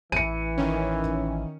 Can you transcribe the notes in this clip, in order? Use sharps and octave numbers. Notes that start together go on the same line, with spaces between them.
A1 E3 C#7 D#7
D#3 C#4